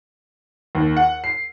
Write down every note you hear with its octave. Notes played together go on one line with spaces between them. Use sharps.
D#2
F#5
C7